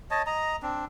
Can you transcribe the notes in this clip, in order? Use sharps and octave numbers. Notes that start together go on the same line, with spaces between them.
C#5 D#5 A5
D#5 A#5
C4 D4